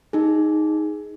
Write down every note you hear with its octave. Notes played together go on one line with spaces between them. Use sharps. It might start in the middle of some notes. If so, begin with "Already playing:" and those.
D#4 G#4